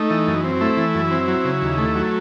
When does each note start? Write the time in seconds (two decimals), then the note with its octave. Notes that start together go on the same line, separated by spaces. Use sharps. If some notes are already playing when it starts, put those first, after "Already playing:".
Already playing: A3 D#4
0.10 E3
0.27 F#2
0.44 C4
0.61 A3 E4
0.77 E3
0.95 F#2
1.11 C4
1.28 F#3
1.45 C#3
1.62 D#2
1.78 A3
1.95 F#3